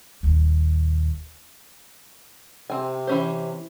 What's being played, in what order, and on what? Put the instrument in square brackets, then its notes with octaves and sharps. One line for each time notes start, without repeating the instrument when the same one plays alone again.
[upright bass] D#1 D#2
[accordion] C3 [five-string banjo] C4 G#5
[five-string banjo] E3 C#4 C5